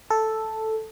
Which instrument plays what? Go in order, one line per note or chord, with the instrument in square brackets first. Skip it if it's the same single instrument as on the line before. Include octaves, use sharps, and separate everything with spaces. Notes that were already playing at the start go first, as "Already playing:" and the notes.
[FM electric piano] A4